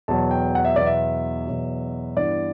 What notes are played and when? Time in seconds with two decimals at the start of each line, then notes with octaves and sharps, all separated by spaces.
0.08 E2 B2 F#3 A5
0.31 G5
0.55 F#5
0.65 E5
0.76 E2 B2 F#3 D5
0.86 E5
1.47 E2 B2 F#3
2.16 G2 E3 B3 D5